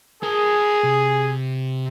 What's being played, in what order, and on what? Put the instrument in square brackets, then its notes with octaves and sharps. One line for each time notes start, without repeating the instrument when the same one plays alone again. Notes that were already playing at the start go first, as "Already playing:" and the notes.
[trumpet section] G#4 [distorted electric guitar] A#4 A5
[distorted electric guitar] C3